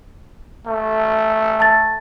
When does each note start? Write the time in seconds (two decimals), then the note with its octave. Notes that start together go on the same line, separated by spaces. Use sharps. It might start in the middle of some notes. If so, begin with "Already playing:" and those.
0.67 A3
1.60 A5 A6